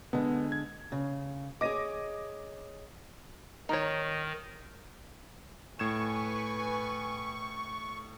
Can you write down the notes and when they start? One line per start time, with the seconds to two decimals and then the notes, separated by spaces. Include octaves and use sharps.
0.13 D3 G#3 B3
0.52 G#6
0.92 C#3
1.61 G#4 C#5 D#5 D6 A#6 D#7
3.69 D#3 D#4 C#5
5.79 A2 B4 G#5 C#6 G#6 E7